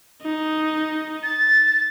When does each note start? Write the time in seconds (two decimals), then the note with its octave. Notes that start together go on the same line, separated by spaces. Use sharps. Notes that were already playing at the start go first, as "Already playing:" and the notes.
0.22 D#4
1.23 A6